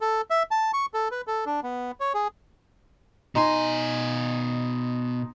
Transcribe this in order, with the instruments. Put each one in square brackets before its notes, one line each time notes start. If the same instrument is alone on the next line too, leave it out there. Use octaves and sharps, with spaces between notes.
[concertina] A4
E5
A5
C#6
A4
B4
A4
D4
B3
C#5
G#4
[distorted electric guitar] B2 G#5 [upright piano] D#4 A#5 C6